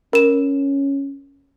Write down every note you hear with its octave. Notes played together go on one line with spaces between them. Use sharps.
C#4 A#4 E7